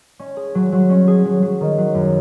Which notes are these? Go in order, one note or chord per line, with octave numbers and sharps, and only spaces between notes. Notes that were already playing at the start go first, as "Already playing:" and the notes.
C#4
G#4
F#3
F#3
C#4
G#4
F#3
F#3
D#3
F#3
F#2